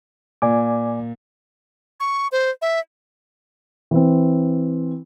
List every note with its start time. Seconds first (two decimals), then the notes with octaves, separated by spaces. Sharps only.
0.42 A#2 D5 G#5 D6
2.00 C#6
2.32 C5
2.62 E5
3.91 E3 C4